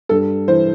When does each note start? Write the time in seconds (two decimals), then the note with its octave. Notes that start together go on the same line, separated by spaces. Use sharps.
0.09 G2 A4
0.48 E3 C5